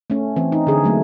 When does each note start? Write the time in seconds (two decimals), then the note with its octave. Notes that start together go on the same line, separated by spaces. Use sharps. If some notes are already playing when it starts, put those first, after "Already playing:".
0.10 A3 C#4
0.36 E3 C4
0.52 D#4
0.67 D3 G#4
0.84 F#3 A3 A#3